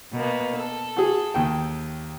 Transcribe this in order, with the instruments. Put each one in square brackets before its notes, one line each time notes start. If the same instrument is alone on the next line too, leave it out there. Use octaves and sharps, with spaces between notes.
[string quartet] B2 A#3 B3
A4
[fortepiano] F#4 G#4
D#2 G5